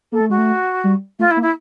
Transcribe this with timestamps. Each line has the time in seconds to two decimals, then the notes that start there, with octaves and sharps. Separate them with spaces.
0.12 A#3 A4
0.20 A3
0.30 G#3 F#4
0.38 A3
0.84 G3
1.19 A3 F4
1.31 E4
1.37 A#3
1.42 E4